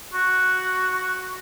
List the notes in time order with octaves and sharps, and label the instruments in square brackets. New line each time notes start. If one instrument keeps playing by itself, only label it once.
[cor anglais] F#4